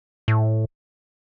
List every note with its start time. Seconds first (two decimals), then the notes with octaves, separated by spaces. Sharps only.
0.28 A2